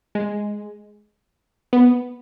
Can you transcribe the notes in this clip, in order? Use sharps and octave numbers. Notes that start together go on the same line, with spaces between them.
G#3
B3